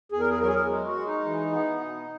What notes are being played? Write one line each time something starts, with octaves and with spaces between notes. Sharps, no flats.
E2 G#4
A#4
G#4
F#3 A#4
G#4
A#4
G#3
F#4
G#3
D#4
E3
B3
B2